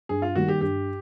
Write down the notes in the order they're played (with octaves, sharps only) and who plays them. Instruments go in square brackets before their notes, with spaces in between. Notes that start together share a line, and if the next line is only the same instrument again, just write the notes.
[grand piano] G2 [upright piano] G#4
[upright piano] F4
[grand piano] D#3 G3 A#3 [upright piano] F#4
[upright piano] G4
[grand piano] G2 [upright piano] G4